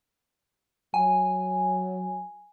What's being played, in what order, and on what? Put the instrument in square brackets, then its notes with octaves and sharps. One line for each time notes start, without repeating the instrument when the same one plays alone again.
[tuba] F#3 [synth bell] G#5